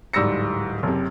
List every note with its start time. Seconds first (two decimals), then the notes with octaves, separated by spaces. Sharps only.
0.13 D1 G#2 G3 E6 A#6 C#7
0.83 F#1 C3